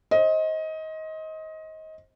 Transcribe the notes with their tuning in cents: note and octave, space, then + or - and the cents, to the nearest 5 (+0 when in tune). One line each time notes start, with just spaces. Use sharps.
C5 +25 D#5 +20